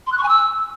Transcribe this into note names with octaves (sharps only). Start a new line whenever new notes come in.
C6
F#6
C#6
G#5
E6